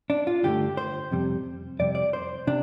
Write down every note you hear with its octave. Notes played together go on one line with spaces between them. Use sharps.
D4
F4
G2 D3 A3 G4
C5
F2 C3 G3
F2 C3 G3 D5
D5
C5
C3 D4